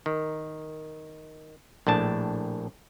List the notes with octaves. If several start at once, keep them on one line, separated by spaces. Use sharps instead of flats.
D#3
A#1 A2 D4 A5